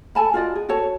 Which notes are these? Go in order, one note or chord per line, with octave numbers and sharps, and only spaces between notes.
A4 G#5 A5 B5
F4 F#4 D5 D#5
G#4
F#4 A4 C#5 A5